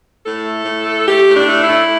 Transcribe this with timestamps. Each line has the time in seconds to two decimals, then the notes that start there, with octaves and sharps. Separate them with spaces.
0.23 A2 A4
0.44 A3
0.65 A2
0.86 A3
1.07 A3 G4
1.27 A2
1.34 D4
1.48 A3
1.62 E4
1.69 A3